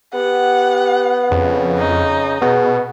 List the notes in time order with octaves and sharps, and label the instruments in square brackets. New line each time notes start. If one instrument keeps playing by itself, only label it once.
[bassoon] B3 [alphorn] G4 [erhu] F#5
[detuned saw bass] F2 [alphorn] C#3
[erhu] D#4
[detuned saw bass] B2 [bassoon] B3 [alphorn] G#4